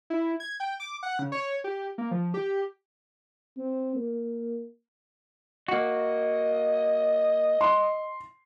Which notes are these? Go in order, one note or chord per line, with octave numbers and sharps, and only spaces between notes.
E4
G#6
G5
D6
F#5
C#3
C#5
G4
A#3
F3
G4
C4
A#3
A#3 F#4 D#5
C6